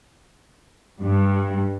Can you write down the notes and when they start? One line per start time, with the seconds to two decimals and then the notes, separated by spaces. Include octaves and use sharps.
1.02 G2